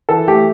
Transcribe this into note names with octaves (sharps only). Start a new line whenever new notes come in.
E3 A4
A3 G4